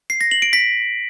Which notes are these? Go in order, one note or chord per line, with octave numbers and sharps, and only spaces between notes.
C7
A#6
F#7
D7
B6